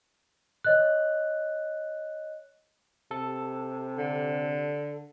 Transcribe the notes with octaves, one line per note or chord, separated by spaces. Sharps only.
C#5 D#5 F#6
C3 A4
D3